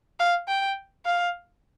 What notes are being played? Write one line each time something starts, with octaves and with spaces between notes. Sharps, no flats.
F5
G5
F5